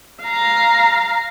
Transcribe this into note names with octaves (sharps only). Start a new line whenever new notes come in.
F5 A#5